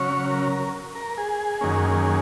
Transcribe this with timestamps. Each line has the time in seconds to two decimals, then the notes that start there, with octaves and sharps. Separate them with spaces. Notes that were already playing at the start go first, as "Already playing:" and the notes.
Already playing: C#3 F#3 C#4 C#5
0.30 A#4
0.95 A#4
1.17 G#4
1.61 F#2 D#3 A#3 C#4